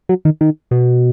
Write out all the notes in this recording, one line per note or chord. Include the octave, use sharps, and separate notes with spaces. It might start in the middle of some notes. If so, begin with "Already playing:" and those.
F#3
D#3
D#3
B2